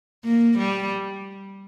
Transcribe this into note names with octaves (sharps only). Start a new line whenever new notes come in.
A#3
G3